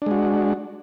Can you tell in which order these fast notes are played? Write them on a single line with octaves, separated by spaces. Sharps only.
D4 G#3 F#4